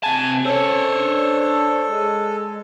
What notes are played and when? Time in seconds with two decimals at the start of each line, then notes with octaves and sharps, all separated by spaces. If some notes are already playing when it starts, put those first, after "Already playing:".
0.04 C3 G#5 A5
0.45 C#4 A4 C5 C#5
0.95 D4
1.89 G#3